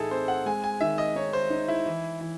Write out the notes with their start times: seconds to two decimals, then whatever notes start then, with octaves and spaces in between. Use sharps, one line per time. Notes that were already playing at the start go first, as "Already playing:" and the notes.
Already playing: A2 E3 D#4 E4 G#4 A4
0.11 C4 C5
0.28 F#5
0.46 G#3 G#5
0.64 G#5
0.81 D#3 E5
0.98 D#5
1.16 D#4 C#5
1.33 C5
1.50 D#4
1.68 E4
1.86 E3
2.21 E3